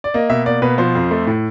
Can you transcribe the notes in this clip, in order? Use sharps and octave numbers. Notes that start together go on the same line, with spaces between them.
D5
A#3 D#5
B2 E5
A#3 D5
B2 B4
F3 C5
F2
A3
A2